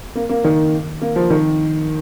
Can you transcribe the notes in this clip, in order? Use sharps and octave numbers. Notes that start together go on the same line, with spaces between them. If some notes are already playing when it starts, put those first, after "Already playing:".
A#3
A#3
D#3
A#3
F3
D#3